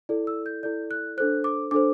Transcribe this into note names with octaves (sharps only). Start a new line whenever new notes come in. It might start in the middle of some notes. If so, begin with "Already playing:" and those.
E4 A4 D5
E6
G6
E4 A4 D5 G6
F#6
D4 A4 C5 F#6
D6
D4 A4 C5 D6